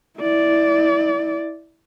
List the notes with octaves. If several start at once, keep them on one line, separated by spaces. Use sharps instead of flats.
E4 D5